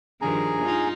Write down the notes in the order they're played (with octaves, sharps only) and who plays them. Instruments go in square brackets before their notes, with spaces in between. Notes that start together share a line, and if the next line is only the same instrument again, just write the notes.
[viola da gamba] G2 D#3 F3 [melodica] G#4 G#5 A#5
[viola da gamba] D#4 F4